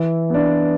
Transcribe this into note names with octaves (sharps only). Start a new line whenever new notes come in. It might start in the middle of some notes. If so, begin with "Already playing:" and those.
Already playing: E3
B3 D4